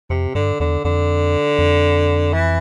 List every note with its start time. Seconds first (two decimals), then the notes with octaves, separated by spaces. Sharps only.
0.10 F2 C3
0.35 G2 D3
0.60 E2 D3
0.84 F2 D3
1.59 F2
2.33 E3